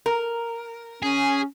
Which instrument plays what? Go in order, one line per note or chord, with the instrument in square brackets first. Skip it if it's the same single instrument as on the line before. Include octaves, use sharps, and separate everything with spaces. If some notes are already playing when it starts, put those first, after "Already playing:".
[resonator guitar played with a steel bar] A#4
[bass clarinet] C#4 [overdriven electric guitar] G#4